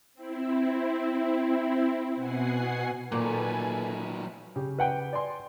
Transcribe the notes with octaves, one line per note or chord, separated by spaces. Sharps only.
C4 E4
B2 F#5 G#5 C7
A#2 D#3 F#3 A#3 A4 B4 G#5
C#3 G4
B4 F#5 G5
D5 G#5 C6